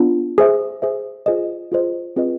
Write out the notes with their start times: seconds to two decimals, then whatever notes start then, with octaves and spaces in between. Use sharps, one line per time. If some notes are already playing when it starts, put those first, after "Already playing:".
Already playing: B3 D4 F4
0.38 G#4 C5 E5
0.82 G#4 C5 E5
1.26 F4 G#4 C5 D#5
1.72 F4 G#4 C5 D#5
2.16 C4 F4 G#4 B4 D#5